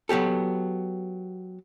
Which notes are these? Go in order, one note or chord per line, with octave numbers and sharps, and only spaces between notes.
F#3 B3 G4 A4